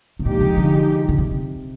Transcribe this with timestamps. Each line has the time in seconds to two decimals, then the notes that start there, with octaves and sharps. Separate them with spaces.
0.19 C3
0.25 A#2 F3 G#3 D#4 G4
0.41 C3
0.57 D3
1.09 D3
1.18 C3